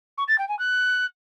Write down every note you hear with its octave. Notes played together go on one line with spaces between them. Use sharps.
C#6
A6
G5
G#5
F#6